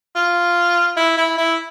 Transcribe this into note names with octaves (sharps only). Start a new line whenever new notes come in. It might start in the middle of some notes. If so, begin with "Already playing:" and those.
F4
E4
E4
E4